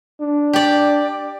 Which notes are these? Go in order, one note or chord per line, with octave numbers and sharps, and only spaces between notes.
D4
G4 D5